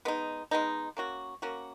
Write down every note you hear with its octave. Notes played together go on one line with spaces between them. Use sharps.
G#3 B3 D#4
G#3 B3 D#4
A#3 C#4 F#4
A#3 C#4 F#4